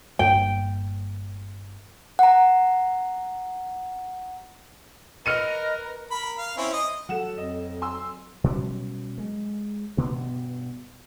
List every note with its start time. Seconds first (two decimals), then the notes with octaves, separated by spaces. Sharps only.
0.19 G1 G2 A#2 G5
2.19 F#5 A#5
5.26 A#4 B4 D#5 F6 C#7 D#7
6.11 A#4 B5
6.38 F5
6.58 C4 C#4 E4
6.73 D#5
7.09 F#3 A4 F#5 E7
7.38 F2 D#5
7.82 G#5 C6 E6
8.44 B2 F#3 G3 C#4
9.18 G#3
9.97 G2 B2 B3